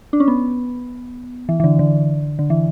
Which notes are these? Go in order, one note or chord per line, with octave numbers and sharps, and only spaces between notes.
D4
C#4
B3
E3
E3
D3
D3
D3
E3